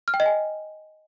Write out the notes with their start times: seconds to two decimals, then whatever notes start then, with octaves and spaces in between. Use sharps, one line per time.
0.08 F6
0.14 G5
0.20 D#5
0.26 G#5